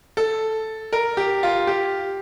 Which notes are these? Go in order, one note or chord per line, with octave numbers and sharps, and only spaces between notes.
A4
A#4
G4
F4
G4